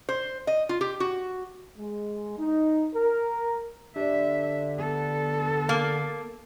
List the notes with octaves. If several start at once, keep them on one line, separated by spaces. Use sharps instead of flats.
C5
D#5
F4
G4
F#4
G#3
D#4
A#4
D3 G4 D5 E5
B3 A4
A#3